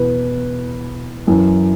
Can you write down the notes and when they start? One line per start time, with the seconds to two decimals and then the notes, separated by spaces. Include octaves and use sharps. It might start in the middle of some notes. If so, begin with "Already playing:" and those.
Already playing: E2 B2 B4
1.27 F#2 E3